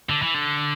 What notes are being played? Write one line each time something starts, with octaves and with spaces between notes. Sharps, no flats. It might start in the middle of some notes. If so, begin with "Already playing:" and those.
D3
E3
D3